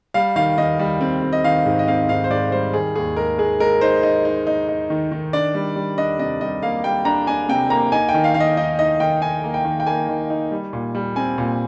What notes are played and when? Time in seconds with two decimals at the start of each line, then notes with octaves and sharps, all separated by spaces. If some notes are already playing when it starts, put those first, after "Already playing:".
0.14 G3 F5
0.36 D#3 F5
0.58 D#3 D#5
0.79 G3
1.01 C4
1.22 C4
1.33 D#5
1.44 D#3 F5
1.66 G#2
1.79 D#5
1.87 C4 F5
2.09 G#2 F5
2.24 C5
2.30 G#2 D5
2.52 G3 C5
2.73 D#3 G#4
2.95 D#2 G#4
3.17 G#3 A#4
3.38 G#3 G#4
3.60 G#3 A#4
3.81 D#4 C5
4.03 D#4
4.25 D#4
4.47 D#4
4.68 D#4
4.90 D#3
5.11 D#3
5.33 D4 D5
5.55 G3
5.76 G3
5.98 D4 D#5
6.19 C3 D#5
6.41 G3 D#5
6.62 A#3 F5
6.84 G3 G5
7.05 D4 A#5
7.27 D4 G#5
7.49 C3 G5
7.70 A#3 A#5
7.92 D#4 G#5
8.09 G5
8.14 D#3
8.24 F5
8.34 D#3 F5
8.40 D#5
8.57 D#4 D#5
8.79 D#4 D#5
9.00 D#3 G5
9.22 D#4 G#5
9.44 A#3
9.54 G5
9.65 D#3
9.80 G5
9.86 A#3 G#5
10.09 D#3
10.30 D#4
10.51 G3
10.73 A#2
10.95 G3
11.16 C4 G#5
11.38 A#2